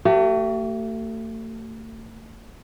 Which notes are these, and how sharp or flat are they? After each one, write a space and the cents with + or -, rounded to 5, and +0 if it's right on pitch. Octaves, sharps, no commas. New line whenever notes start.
A3 +35 G4 -35